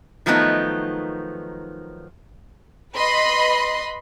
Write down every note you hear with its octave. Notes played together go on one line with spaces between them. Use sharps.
D#3 F3 F#3 A3 B3 D#4
B4 D#5 B5 C6